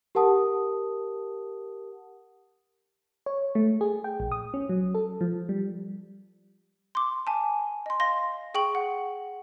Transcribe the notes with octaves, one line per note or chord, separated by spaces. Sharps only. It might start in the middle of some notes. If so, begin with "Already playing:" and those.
G4 A#4 F#5 A5 D#6
C#5
A3
G#4
G5
A#1
D#6
C#4
F#3
A4
F3
G3
C6 D6
G#5 A5
D#5 C6
F5 C6 A#6
G#4 G5 C#6 F#7
F#5